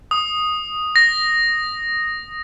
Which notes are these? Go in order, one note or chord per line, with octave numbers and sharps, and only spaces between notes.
D#6
A#6